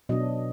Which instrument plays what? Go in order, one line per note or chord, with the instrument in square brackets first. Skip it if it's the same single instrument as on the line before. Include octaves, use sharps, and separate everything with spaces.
[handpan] B2 F#3 D4 D#5